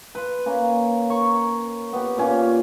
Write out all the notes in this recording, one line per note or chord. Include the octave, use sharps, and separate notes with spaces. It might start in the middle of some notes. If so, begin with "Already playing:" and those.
B4 C6
A#3 C#4
A#4 C#5 C#6
B3 G4
A#2 C#4 F5